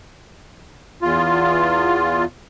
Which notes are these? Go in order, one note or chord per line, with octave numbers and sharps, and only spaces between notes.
E2 F4